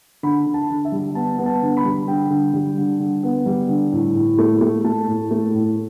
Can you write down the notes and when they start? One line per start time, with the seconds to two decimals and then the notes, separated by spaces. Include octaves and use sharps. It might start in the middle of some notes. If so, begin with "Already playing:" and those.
0.23 D3 B5
0.46 D3
0.54 A5
0.70 D3
0.85 E5
0.92 G3
1.15 B3 A5
1.38 B3
1.46 A5
1.62 D3
1.77 B5
1.85 G3
2.07 D3 G5
2.30 D3
2.53 G3
2.77 D3
3.00 D3
3.23 B3
3.46 G3
3.69 D3
3.92 A2
4.15 A2
4.38 A3
4.61 A3
4.84 A3 A5
5.07 A2
5.31 A3
5.54 A2